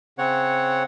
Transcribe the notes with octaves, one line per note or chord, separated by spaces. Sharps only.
C#3 C4 C#5 F#5